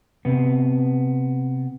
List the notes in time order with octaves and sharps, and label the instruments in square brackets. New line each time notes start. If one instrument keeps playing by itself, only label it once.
[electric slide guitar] C3 B3